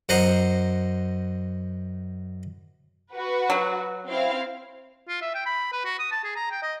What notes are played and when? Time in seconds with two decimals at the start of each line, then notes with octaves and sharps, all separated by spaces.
0.09 F#2 C5 D#5 F#5 A#5 C6
3.11 F#4 B4
3.50 F#3
4.07 C4 E4 F5
5.08 F4
5.21 E5
5.34 G5
5.46 B5
5.72 B4
5.85 F#4
5.99 D#6
6.12 A5
6.24 G#4
6.36 A#5
6.51 G5
6.62 D#5